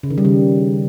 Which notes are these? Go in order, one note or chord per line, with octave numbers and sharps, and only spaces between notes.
C#3
D#3
G3
C#3